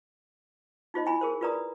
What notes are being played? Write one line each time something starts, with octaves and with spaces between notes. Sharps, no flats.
D#4 F4 C5 D#5
E4 G#5 B5
G#4 A#4 C5
F4 A#4 B4 D5 A#5 D#6